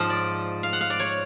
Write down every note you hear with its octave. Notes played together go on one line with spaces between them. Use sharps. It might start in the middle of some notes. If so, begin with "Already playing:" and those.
Already playing: G#2 F3 F4
D5
F5
F#5
F5
D5
C#5